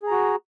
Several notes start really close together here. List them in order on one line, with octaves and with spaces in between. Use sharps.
G#4 A#5 F#4